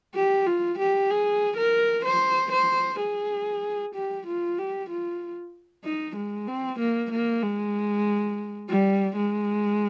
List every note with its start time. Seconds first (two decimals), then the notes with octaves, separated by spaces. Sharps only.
0.15 G4
0.47 F4
0.79 G4
1.10 G#4
1.57 A#4
2.06 C5
2.52 C5
3.00 G#4
3.95 G4
4.27 F4
4.59 G4
4.89 F4
5.84 D#4
6.16 G#3
6.47 C4
6.79 A#3
7.11 A#3
7.42 G#3
8.69 G3
9.16 G#3